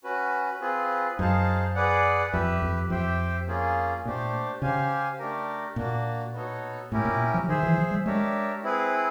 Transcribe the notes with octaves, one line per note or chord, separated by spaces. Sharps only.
C#4 F#4 B4
C4 F4 G#4 B4
F#2 D#4 G#4 C5 F5 A5
G#4 B4 D5 F#5
F2 G4 B4 E5
F2
F2 G4 C5 E5 G5
A#3 C#4 F4 G#4
A#2 A3 D4 G4 C5
C#3 G4 C5 F5 G#5
A3 D4 G4 A#4
A#2 A#3 D4 F#4
B3 D#4 F#4 A4 C#5
A2 C#4 E4 G4 A#4
A#2
F3
D#3 G#4 C5 E5
E3
F3
G3
G#3 D4 G4 A#4 C#5 E5
C4 E4 G#4 B4